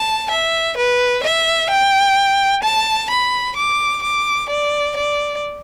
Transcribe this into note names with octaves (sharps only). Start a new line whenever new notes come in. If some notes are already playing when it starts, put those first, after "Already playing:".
Already playing: A5
E5
B4
E5
G5
A5
B5
D6
D6
D5
D5